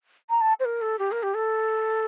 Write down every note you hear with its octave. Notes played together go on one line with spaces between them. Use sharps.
A#5
A5
C5
A#4
A4
G4
A#4
G4
A4